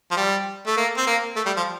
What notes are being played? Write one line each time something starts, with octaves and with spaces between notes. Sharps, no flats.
F3
G3
A3
A#3
C4
A#3
A3
G3
F3